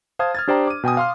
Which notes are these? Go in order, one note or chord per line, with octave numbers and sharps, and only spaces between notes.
C5 F5 A5 D#6 F6 G#6
F6 G#6 A6
D4 G4 C5 D5 G5 A#5
D6 D#7
B2 G5 G#5 D#6
F5 C6 F6